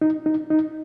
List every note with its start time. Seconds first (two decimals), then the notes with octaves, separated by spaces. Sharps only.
0.02 D#4
0.26 D#4
0.50 D#4